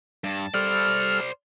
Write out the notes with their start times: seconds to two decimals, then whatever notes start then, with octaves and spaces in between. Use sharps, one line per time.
0.24 G2 A5
0.54 G3 A4 C5 D5 F6